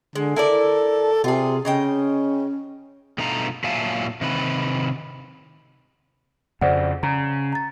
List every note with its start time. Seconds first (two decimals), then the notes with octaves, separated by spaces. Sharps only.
0.15 D3 G#3
0.36 E4 A4 A#4 D5
1.24 C3 F4 G#4
1.65 C#3 C#4 D#5 G5
3.18 G2 B2 A3 D#4 F4 A#5
3.64 A#2 F#3 E5 F5 G#5 A5
4.21 C3 D#3 B4
6.61 F2 C#3 C5 D5 F#5
7.03 C#3 A#5
7.53 A#5 A6